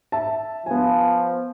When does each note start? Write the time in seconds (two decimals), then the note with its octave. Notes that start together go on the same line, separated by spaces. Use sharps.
0.12 E5 A5
0.66 F3 B3 G#5